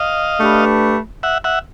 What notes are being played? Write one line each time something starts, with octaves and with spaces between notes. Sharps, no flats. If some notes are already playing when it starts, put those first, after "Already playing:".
Already playing: D#5 F5
A3 D4 G4 B4
E5 F#5
E5 F#5